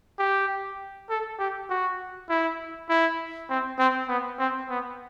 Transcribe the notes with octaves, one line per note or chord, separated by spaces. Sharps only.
G4
A4
G4
F#4
E4
E4
C4
C4
B3
C4
B3